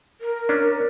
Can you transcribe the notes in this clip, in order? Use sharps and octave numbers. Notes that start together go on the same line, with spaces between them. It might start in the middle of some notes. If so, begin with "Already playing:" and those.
A#4
C#4 D4